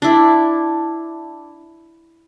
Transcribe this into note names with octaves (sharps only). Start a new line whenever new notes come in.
D4 E4